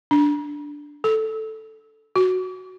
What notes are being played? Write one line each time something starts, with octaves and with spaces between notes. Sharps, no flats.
D4
A4
F#4